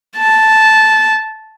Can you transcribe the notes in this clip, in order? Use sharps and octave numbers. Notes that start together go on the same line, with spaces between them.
A5